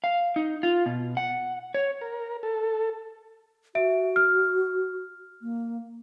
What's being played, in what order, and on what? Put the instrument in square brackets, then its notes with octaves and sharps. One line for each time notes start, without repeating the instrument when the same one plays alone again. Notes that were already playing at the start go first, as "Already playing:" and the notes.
[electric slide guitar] F5
D#4
F4
B2
F#5
C#5
[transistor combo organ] A#4
A4
[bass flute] F#4 [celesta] E5 D7
[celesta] F6
[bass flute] A#3